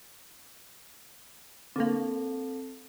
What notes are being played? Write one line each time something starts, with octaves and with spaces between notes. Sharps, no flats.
D3 A#3 C4 A4